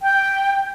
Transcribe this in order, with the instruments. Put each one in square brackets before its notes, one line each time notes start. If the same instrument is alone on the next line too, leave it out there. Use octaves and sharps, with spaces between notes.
[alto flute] G5